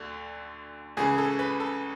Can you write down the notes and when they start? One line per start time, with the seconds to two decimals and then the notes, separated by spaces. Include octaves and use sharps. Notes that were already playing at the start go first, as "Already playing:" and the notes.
Already playing: D2 D3
0.97 C#2 C#3 E3 G#4
1.18 A4
1.39 B4
1.60 A4